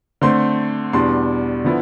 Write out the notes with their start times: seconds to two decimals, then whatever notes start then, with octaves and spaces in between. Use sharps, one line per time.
0.21 D3 A3 C4 C6
0.93 E2 B2 G3 D4 C6
1.64 D3 F3 B3 E4